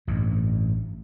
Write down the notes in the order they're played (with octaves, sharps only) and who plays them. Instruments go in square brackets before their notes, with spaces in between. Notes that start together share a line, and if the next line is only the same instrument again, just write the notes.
[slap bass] A1 G2